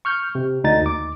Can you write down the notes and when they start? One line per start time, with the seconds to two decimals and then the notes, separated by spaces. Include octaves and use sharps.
0.05 C#6 F6 G6
0.35 C3
0.64 D2 D#4 A6
0.81 D#2 D6